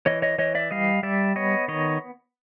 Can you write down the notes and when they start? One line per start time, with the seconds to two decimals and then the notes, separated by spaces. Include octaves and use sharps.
0.06 E3 C#5 D#5
0.22 C#5 D#5
0.38 E3 C#5 D#5
0.55 D5 E5
0.71 G3 D#5 F5
1.03 G3 D5 E5
1.36 B3 C#5 D#5
1.68 D#3 C#5 D#5